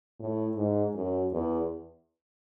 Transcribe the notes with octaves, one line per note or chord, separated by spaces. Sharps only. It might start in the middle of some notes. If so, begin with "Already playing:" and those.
A2
G#2
F#2
E2